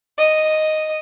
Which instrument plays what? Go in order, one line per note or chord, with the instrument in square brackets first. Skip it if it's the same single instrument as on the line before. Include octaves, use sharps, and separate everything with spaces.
[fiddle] D#5